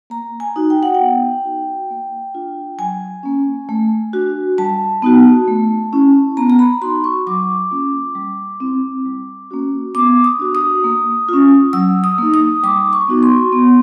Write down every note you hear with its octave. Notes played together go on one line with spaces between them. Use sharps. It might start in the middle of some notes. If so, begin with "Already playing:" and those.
A#3 A#5
G#5
D#4 F#4
G5
F#5
G5
B3
D#4 F#4
A#3
D4 F4
F#3 G#5
A#3 C#4
A3
D4 F#4
G3 A5
B3 D#4 F#4
A3
C#4 E4
B3 A#5
A#5
B5
D#4 F#4 C6
C#6
F#3 D6
A#3 C#4 F4
G3
C4 E4
G3
A#3 C#4 F#4
B3 D6
D#6
D4 F#4
D#6
A#3
C#4 F4
F#3 E6
D#6
A#3 D#4
D#6
G3 D6
C#6
B3 D#4 F#4
C6
B3